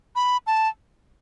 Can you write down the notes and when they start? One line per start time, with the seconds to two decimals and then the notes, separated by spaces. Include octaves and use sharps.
0.15 B5
0.47 A5